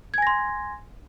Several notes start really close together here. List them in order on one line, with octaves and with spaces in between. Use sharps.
G#6 G#5 A#6 C6